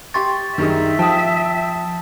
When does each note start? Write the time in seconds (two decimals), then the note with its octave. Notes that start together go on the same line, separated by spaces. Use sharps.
0.14 G4 C6 C#6 A6
0.58 F#2 D#3 G3 D#4 G#4 E5
0.99 F3 G5 A5 D#6